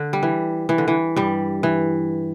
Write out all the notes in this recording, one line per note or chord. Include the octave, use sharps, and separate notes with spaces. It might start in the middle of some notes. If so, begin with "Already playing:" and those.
Already playing: D3
G3
E3
E3
D3
E3
G2 G3
E3